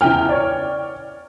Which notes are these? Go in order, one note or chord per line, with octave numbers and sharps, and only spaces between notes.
E2 C#3 E4 G5 F6
C#5 D5